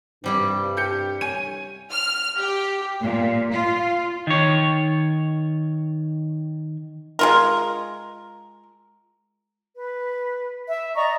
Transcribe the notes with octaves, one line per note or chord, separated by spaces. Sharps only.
G2 C3 G3 E4
G4 G6 C#7
C#5 G#5 D#7
F6
G4
A#2
F4
D#3 C#5
G#3 F4 A#4
B4
E5
D5 D#5 A#5 C#6